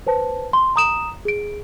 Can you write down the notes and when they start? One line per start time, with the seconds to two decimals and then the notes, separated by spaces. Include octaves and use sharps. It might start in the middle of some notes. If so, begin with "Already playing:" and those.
0.07 B4 C5 A5
0.53 C6
0.76 A#5 D#6 E7
1.25 G#4 D7